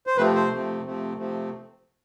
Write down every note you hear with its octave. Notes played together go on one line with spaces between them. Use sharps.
C5
C3 F3 A3 C4 B4
C5
C3 F3 A3 C4
C3 F3 A3 C4
C3 F3 A3 C4